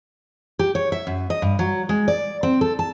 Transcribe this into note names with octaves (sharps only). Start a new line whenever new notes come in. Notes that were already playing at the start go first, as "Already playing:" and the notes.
G4
C#5
E5
F#2
D#5
G2
F#3
G#3
D5
C4
A4
A5